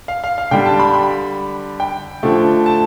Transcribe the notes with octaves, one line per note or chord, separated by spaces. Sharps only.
F5
F5
F5
D3 G3 G5
A5
B5
B5
G5
D3 F3 A3
A5